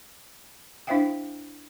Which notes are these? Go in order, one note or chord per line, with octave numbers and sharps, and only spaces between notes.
D4 E4 C5 E5 F5 G5